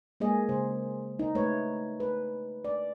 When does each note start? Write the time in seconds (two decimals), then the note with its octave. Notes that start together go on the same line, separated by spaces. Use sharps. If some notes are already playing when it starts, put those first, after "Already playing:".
0.20 G#3 A#3 G#4 D#5
0.49 C#3 C5
1.19 D#4
1.35 A3 B4 C#5
2.00 B4
2.65 D5